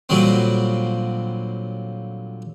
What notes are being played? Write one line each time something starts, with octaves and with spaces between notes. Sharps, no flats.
A#2 D3 F#3 G3 C4